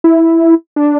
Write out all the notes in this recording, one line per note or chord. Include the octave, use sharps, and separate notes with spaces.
E4
D4